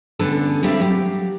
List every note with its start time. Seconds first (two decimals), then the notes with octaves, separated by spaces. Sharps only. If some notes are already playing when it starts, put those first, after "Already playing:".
0.19 D3 G3 B3 C#4 D4 A4
0.63 G3 C4 G4 D5 E5 F5
0.80 F#3 G4